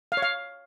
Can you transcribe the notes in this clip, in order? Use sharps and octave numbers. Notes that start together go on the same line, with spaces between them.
F5
C#5
F5